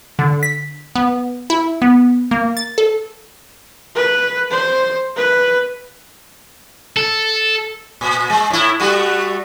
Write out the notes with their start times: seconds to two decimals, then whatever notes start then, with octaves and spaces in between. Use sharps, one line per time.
0.19 D3
0.43 B6
0.96 B3
1.50 E4
1.82 B3
2.31 A#3
2.57 A6
2.78 A4
3.95 B4
4.51 C5
5.16 B4
6.96 A4
8.01 A#2
8.30 G#3
8.50 A2 E4
8.80 G3 A3 F#4